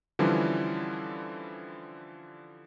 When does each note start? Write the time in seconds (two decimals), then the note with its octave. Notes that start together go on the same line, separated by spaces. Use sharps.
0.19 D3 E3 F3 G3 C#4 E4